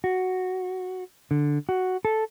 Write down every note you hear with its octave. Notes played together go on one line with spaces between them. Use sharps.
F#4
D3
F#4
A4